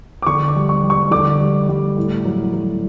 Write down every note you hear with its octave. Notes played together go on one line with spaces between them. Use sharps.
D6
D3 C#6
D6
G3
C#6
G3
C#6
D3 D6
G3
G3
A2
F#3
F#3